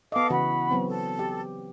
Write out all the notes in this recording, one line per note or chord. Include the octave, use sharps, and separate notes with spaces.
B3 A4 D#5 F5 D6
C#3 E3 F#4 F#5 B5
F#3 B3 C4
A4
G4